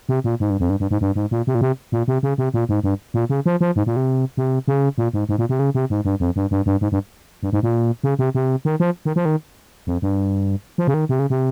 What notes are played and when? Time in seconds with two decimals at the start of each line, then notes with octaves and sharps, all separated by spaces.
0.09 C3
0.24 A#2
0.40 G#2
0.50 G2
0.60 F2
0.70 G2
0.80 G2
0.91 G#2
1.01 G2
1.15 G#2
1.31 A#2
1.47 C3
1.55 A#2
1.61 C3
1.92 A#2
2.08 C3
2.23 C#3
2.38 C3
2.54 A#2
2.69 G#2
2.84 G2
3.14 A#2
3.30 C#3
3.46 F3
3.61 F3
3.76 G#2
3.86 A#2
3.96 C3
4.37 C3
4.68 C#3
4.98 A#2
5.13 G#2
5.29 G#2
5.38 A#2
5.49 C3
5.59 C#3
5.75 C3
5.90 G#2
6.05 G2
6.20 F2
6.36 G2
6.51 G2
6.66 G2
6.81 G#2
6.92 G2
7.43 G2
7.53 G#2
7.63 A#2
8.04 C#3
8.19 C3
8.35 C3
8.65 D#3
8.80 F3
9.05 D#3
9.16 F3
9.25 D#3
9.87 F2
10.02 G2
10.78 F3
10.87 C#3
10.94 D#3
11.09 C3
11.19 C#3
11.30 C3